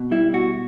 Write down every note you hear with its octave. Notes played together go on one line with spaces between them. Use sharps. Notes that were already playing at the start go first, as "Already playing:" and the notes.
Already playing: B2
G3 E4
B2 F#4